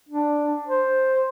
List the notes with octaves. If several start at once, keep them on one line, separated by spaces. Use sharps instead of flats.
D4
C5